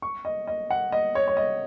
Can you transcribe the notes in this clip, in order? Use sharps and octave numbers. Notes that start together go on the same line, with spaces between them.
C#6
D#5
D#5
F#5
D#5
C#5
C#5
D#5